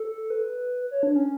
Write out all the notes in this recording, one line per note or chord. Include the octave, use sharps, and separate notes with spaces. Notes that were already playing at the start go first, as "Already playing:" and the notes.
Already playing: A4
B4
C#5
D4
C#4